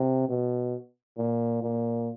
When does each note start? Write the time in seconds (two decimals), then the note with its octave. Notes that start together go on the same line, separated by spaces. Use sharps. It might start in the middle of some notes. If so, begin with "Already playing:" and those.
Already playing: C3
0.29 B2
1.18 A#2
1.63 A#2